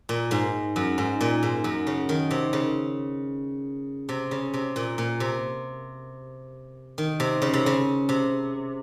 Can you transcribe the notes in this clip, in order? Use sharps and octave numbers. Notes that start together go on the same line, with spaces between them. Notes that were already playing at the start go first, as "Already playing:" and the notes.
A#2
G#2
F#2
G#2
A#2
G#2
F#2
C#3
D#3
C3
C#3
C3
C#3
C3
A#2
A#2
C3
D#3
C3
C#3
C3
C#3
C3